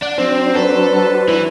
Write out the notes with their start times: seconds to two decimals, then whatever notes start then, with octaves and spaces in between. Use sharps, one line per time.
0.02 D4 F#5
0.18 F#3 C4 D4 C5
0.55 A4 B4
1.29 E3